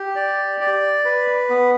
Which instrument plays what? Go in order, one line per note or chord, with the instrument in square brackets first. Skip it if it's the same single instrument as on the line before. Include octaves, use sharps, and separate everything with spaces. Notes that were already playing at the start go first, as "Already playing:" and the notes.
Already playing: [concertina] G4
D5
D5
B4
B3